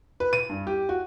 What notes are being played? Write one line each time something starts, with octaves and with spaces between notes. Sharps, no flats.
B4
D#7
G2
G4
F#4